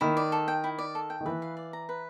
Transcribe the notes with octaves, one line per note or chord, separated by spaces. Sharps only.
D#3 E4
D5
A4
G5
E4
D5
A4
G5
D#3
E3 B4
F5
D5
A#5
B4